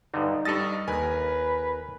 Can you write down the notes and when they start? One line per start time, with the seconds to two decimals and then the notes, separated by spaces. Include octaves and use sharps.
0.14 G2 D3 D#4
0.45 G2 G3 A4 D#5 A6
0.88 D#2 A#4 B4 G#5